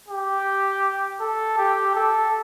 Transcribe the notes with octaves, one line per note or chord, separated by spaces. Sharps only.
G4
A4
G4
A4